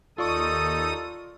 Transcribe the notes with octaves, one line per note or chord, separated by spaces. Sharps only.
D#2 D#4 F4 A4 D5 C#6 D#6